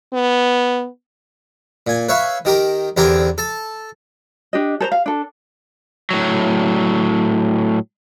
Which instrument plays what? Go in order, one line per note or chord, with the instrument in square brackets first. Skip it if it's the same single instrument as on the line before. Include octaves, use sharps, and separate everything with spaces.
[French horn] B3
[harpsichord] A#2 G#5
B4 C#5 E5 F5
D#3 G4 A#4
E2 D3 C4 G4 A#4 G#5
A4 A5
[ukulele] D4 G4 D#5
A4 C5 A#5
F5
D4 A4
[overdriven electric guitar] A2 F#3